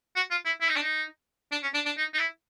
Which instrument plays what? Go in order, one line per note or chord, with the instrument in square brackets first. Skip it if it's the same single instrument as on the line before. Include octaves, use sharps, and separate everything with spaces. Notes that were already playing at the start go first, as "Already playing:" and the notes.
[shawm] F#4
F4
E4
E4
D#4
D4
D#4
D4
C#4
D4
D4
D#4
D#4
E4